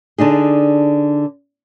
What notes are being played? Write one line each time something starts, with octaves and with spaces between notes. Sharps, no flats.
D3 D4 D#4 G#4